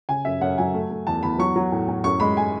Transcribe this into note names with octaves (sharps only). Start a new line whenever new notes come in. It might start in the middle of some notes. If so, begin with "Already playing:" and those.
C#3 G#5
F#2 E5
F#2 F#5
F#3 G#5
A3
A3
E2 A5
E2 B5
F#3 C#6
F#3
A2
A2
F#2 C#6
G#3 B5
G#5